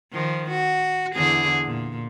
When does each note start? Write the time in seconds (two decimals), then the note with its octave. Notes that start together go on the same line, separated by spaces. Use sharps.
0.13 D#3 F3
0.51 F#4
1.15 E2 D3 G#4
1.65 A#2